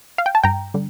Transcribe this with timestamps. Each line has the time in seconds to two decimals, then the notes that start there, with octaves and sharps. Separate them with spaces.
0.18 F5
0.26 G5
0.35 A5
0.44 G2 G5 A#5
0.74 D3 G3